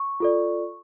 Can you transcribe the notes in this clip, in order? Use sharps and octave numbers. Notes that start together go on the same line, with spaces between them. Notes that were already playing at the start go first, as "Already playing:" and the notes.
Already playing: C#6
F4 A4 D5